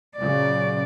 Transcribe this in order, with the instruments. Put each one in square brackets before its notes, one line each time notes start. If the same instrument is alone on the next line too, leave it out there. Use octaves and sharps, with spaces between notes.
[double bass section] A#2 C#3 F#3 [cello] D5